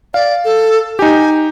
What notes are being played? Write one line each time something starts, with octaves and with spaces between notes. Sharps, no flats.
D5 F5
A4
D#4 G4 G#5